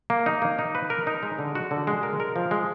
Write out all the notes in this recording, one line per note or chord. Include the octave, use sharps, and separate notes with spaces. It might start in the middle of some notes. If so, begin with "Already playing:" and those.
A#3
D#4
A#3
D#4
B4
A#4
D#4
G#3
D3
F#4
D3
G#3
A#4
A#4
F3
G#3